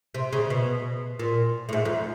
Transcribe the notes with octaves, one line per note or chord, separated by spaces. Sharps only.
C3
C#3
B2
A#2
A2
G#2
F2